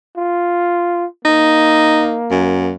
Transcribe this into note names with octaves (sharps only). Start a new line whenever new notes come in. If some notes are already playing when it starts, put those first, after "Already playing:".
F4
A#3 D#4
F#2